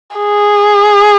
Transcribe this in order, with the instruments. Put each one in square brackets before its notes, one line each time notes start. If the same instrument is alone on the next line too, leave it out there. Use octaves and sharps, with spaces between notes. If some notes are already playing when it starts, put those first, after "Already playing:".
[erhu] G#4